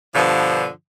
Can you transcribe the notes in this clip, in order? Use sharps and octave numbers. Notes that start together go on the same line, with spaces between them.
G2 B2 D3 F3